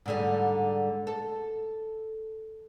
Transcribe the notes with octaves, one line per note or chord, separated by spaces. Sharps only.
G#2 D3 G3
A4